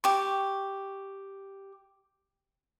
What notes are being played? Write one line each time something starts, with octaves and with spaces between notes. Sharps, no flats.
G4 C#6